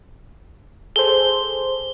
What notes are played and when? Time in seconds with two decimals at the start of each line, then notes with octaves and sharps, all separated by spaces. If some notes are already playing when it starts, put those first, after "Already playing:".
0.96 G#4 A4 C5 G7